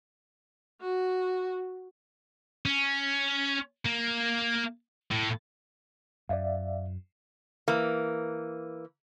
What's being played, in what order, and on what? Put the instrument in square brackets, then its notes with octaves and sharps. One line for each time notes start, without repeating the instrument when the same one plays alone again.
[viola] F#4
[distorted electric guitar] C#4
A#3
A2
[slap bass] F#2 [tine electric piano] D5 E5 F5
[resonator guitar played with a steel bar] E3 A#3